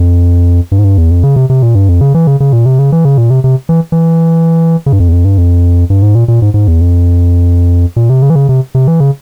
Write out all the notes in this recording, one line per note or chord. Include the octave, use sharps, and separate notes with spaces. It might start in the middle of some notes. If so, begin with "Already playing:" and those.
Already playing: F2
G2
G#2
G2
E2
F2
C#3
C3
C3
A#2
G2
F2
C#3
E3
C#3
C#3
A#2
C3
C#3
E3
C#3
A#2
C3
C3
E3
E3
C#3
G2
F2
E2
F2
G2
F2
G2
G#2
A#2
A#2
G#2
G#2
E2
F2
A#2
C3
C#3
E3
C#3
C3
C3
E3
C#3